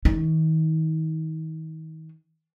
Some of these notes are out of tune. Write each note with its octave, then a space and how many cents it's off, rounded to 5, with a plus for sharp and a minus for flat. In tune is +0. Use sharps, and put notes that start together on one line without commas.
D#3 +35